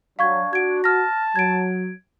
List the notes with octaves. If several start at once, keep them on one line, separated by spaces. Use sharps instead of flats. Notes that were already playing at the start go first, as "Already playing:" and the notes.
F#3 D4 F5 C#6 G#6
F#4 G#6 D7
A5 F6 A#6
F#3 G#6 D7